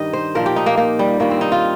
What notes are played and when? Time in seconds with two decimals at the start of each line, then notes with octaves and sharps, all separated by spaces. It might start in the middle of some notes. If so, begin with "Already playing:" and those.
Already playing: G2 D#3 G3 D#4 D#5
0.13 C5
0.35 A#2 F3 A#4
0.46 G4
0.56 D#4
0.66 A#3
0.77 A#3
0.99 G3
1.20 G2 D#3 G3 A#3
1.31 C4
1.41 D#4
1.52 F4